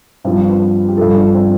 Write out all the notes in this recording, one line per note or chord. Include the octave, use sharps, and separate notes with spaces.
G2 F3 C4
B4
G4
G2 F3 A4
D4
C4